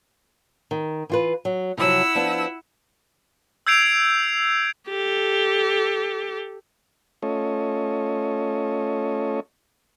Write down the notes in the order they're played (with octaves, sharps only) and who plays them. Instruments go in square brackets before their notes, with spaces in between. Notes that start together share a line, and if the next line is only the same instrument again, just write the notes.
[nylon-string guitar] D#3
E3 F4 B4
F#3
[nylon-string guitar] C3 F3 F#3 [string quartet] E4 F#5 E6
[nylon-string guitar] F3 B3 D4
[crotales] E6 G6 G#6 C7 D7 F7
[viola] G4 A4
[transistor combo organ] A3 C#4 F4 A4 C#5 D#5